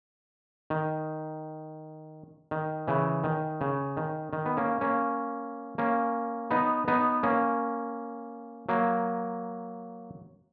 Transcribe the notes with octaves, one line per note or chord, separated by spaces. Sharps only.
D#3
D#3
C#3 E3
D#3
C#3
D#3
D#3
B3
A#3 C#4
A#3 C#4
A#3 C#4
B3 D#4
B3 D#4
A#3 C#4
F#3 A#3